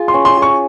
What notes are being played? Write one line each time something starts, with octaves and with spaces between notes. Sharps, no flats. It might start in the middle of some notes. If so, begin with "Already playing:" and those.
Already playing: F4 G#4
C6
C#4
C6
G#4
C#6